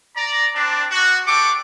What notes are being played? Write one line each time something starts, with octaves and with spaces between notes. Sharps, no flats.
D5 A#5
C4 D4
F#4
D4 G4 A4 C#6 D6